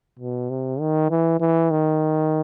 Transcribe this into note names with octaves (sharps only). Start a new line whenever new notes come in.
B2
C3
D#3
E3
E3
D#3